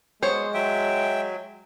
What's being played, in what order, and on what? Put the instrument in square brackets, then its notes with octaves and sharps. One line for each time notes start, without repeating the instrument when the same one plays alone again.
[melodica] F#3 B3 [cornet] G#3 [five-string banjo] C5 C#5
[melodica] F#3 [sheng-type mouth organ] E5 G5